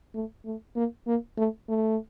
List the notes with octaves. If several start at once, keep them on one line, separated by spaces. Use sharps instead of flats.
A3
A3
A#3
A#3
A3
A3